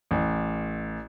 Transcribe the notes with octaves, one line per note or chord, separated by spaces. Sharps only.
A1